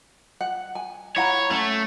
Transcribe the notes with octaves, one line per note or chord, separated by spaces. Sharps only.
F#5
G#5
E4 C#5 F#5 A#5
A3 C#4